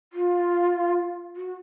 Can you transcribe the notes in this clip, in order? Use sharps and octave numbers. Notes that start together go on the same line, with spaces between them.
F4
F#4